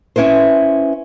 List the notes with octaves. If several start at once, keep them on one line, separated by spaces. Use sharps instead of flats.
C#4 E4 B4 C5